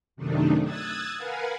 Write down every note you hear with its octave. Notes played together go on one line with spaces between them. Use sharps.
F#2 C3 D#3 A3 D4 D#4
D#6 E6 F#6 G#6 A6
A#4 B4 F5 F#5 G#5